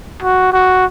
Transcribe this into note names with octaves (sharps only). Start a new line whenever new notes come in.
F#4
F#4